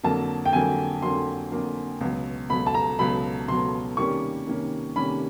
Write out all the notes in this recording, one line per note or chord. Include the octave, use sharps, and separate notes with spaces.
F2 D3 F#3 A#3 A5
G5
F2 D3 F#3 A#3 G#5
F2 D3 F#3 A#3 C6
F2 D3 F#3 A#3
C#2 B2 F#3
C#2 B2 F#3 B5
A5
A#5
C#2 B2 F#3 B5
C#2 B2 F#3 C6
C3 D#3 G3 A#3 C#4 C#6
C3 D#3 G3 A#3 C#4
C3 D#3 G3 A#3 C#4 B5